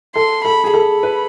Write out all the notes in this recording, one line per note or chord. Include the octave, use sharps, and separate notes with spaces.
A4 C6
A4 B5
G#4
A4 B5
B4